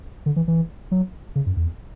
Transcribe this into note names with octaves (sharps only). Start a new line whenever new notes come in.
D3
E3
E3
F#3
C#3
F#2
E2